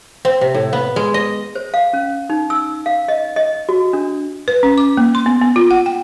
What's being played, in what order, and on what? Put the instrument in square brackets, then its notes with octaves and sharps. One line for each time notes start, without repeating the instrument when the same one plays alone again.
[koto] C4
C3
A2
B3
G#3
D#5
[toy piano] C5
F5
C#4
D#4
E6
F5
D#5
D#5
F#4
D4
[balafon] B4
C#4
D6
A#3
C6
B3
B3
F4
F#5
G5